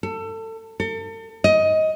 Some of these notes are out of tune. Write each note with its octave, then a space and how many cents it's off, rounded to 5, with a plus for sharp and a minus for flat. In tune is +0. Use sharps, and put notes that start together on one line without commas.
A4 +25
A4 +40
D#5 +15